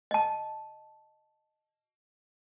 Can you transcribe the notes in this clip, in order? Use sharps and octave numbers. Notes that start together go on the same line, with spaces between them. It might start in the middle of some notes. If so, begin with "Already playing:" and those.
D#5 A5